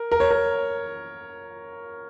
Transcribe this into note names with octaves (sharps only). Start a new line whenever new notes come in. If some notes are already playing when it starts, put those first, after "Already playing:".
Already playing: A#4
A#4
C#5
A#4